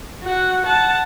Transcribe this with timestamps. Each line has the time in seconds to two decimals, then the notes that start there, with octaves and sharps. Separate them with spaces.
0.23 F#4 F#5
0.64 F#5 A5